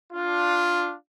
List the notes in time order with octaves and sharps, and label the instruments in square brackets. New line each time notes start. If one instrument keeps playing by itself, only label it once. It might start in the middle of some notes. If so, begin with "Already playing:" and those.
[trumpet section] D4 F4